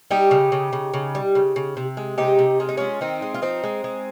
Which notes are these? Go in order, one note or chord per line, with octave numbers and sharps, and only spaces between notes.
G3 D#4 G4
C#3
C#3
C#3
C#3
G3
C#3
C#3
C3
G#3
C3 D#4 G4
C3
G#3 F4
D#4
G#3 C#4 F4
D#3 C4 D#4
G#3
F4
F3 C4 D#4
G#3
G#3